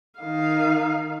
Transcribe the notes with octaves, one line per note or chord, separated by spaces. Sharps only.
D#3 F5